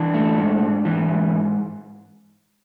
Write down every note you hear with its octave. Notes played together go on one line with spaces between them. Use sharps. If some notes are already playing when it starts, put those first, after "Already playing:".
Already playing: E3 D4
A3
G#2
G#2
E3
G#2